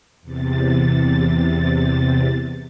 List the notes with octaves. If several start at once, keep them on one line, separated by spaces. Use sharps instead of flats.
E2 C3 A6